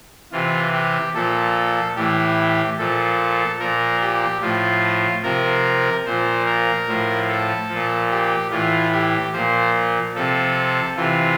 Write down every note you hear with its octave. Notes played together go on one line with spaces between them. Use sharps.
C3 E3 F4
G4
A#2 F3 A4
A2 E3 G4
A#2 F3 A4
A#2 F3 A#4
G4
A2 F3 F4
C3 F3 A#4
A#2 F3 C5
A#4
A2 F3
A4
A#2 F3
G4
A2 E3 F4
G4
A#2 F3 C5
C3 F3 A4
C3 E3 F4